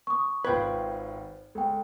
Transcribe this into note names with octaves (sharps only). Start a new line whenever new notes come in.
C#6 D#6
G#1 F4 B4 C5 G5 G#6
C#2 A4 G5